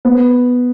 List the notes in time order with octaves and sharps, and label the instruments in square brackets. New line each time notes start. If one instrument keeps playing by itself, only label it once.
[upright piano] B3